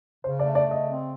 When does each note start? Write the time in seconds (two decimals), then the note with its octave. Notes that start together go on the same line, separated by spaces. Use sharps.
0.24 C#3 C5
0.39 D5
0.44 A3
0.55 D5
0.67 C#3 D#5
0.88 C4